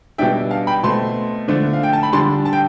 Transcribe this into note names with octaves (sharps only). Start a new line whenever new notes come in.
B2 G3 D4 E5 G5
F5 A5
G5 B5
B2 A3 C4 A5 C6
D3 F3 A3 D4
F5
G5
A5
B5
D3 G3 D4 A5 C6
A5
G5